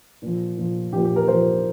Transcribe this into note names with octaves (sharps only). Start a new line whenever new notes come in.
A#2 F3
A#2 F3
A#2 F3 G4
G4
A#4
A#2 F3 C5